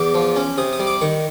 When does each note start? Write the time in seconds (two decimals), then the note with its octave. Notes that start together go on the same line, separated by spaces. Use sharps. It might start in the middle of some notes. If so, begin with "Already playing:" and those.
Already playing: E2 D6
0.14 F3
0.36 C#4
0.58 C3 D#6
0.73 D#6
0.80 G3
0.87 D6
1.01 D#3 C#6